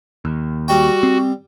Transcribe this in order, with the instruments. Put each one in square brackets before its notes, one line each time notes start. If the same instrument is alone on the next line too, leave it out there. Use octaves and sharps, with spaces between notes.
[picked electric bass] D#2
[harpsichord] G3 G5 [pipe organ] F#4
[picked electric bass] C4